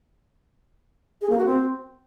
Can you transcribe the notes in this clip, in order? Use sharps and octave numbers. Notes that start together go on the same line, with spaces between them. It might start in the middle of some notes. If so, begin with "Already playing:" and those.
G#4
A#3
F#4
C4